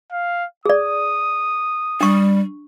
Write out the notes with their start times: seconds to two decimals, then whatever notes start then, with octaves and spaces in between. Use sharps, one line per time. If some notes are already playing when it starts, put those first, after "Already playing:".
0.12 F5
0.65 G#4 D5 D#6
2.01 G3 D4 C#6